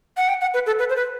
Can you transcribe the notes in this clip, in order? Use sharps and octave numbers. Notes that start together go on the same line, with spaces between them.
F#5
G5
F#5
B4
A4
B4
C5
B4